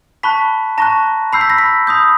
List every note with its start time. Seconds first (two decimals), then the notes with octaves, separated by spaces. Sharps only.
0.23 A5 B5 C#6 F#6 B6
0.78 A5 A#5 C#6 F#6 A#6
1.33 B5 E6 G6 C7
1.41 B6
1.50 A#6
1.58 B5 B6
1.87 B5 D#6 G6